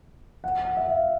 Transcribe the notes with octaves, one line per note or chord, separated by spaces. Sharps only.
F#5
F#5
E5
F5